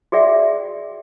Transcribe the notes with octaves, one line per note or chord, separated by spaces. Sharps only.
F#4 G#4 D5 E5 G5